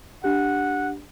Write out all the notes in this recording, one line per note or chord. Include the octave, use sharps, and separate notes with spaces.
D4 G4 F#5